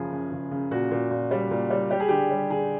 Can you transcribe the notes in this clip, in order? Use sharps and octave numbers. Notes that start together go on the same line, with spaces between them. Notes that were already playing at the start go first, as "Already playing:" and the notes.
Already playing: F#1 C#3 F3 G#4
C#3
C#3
C#3
A#2 F#4
A#2
A#2
G3
A#2
G3
G3 G4
G#4
D3 G4
G3
D3 G#4